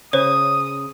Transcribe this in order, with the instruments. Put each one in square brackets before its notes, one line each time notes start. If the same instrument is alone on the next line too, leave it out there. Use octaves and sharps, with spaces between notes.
[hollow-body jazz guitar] C#3 [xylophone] C5 C#5 [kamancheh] D#6